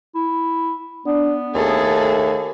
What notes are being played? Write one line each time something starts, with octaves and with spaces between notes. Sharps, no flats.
E4
B3 D4
D#2 A3 G#4 A4